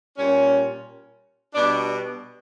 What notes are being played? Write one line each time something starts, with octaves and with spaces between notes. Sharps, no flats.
A#2 G3 C#4
B2 G3 D4